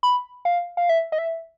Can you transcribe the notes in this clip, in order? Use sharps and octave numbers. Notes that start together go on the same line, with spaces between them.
B5
F5
F5
E5
D#5
E5